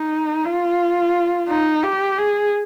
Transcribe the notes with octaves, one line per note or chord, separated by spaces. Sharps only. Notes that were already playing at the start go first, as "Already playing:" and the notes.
Already playing: D#4
F4
D#4
G4
G#4